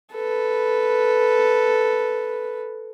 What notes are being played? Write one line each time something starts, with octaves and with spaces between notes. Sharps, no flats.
A4 B4